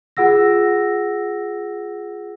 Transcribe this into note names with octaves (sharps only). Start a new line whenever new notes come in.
F4 G#4 F#5 E6 A#6